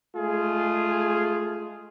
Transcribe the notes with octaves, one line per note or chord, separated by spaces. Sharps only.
G#3 A3 F4 G#4